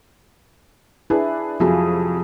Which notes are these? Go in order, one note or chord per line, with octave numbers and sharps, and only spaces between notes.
D4 E4 G#4 B4
F2 C3 F3 F#3 F4 G#4